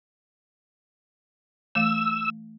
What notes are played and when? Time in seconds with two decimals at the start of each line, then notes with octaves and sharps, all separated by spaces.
1.75 E3 A3 F5 E6